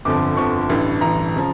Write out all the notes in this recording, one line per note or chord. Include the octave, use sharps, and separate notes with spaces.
G1 F2 D3 F3 D6
G1 F2 D3 F3 C#6
A1 G2 E3
A1 G2 E3 A#5
C#3 F3